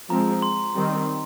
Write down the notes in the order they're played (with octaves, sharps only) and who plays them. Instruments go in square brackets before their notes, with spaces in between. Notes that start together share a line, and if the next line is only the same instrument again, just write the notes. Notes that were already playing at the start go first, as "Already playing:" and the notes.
[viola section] F3 G#3 C4 [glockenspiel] A#5
[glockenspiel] C6
[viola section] D#3 G3 C4